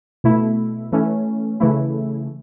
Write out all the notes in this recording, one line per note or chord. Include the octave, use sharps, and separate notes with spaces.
B2 A3 E4
E3 A3 C#4
C#3 E3 A3 E4